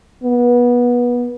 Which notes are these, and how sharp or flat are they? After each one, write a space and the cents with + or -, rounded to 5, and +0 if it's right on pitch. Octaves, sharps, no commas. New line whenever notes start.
B3 -25